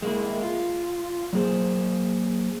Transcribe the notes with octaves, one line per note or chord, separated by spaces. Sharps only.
G#3 A#3 E4
F4
F#3 A#3 G#4 C5